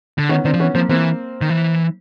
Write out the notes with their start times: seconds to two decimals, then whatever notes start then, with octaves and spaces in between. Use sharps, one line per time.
0.18 D3
0.29 D#3 B3 C#4
0.45 D#3 C4 D4
0.54 F3
0.60 E3 B3 C#4
0.75 F3 A#3 C4
0.89 E3 A#3 C4
1.41 D#3
1.50 E3